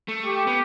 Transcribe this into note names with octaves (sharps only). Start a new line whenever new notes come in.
A3
G4
B3